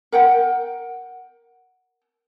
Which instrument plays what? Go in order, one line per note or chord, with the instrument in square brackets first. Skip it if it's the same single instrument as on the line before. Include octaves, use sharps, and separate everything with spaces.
[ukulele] A#4 F#5 G5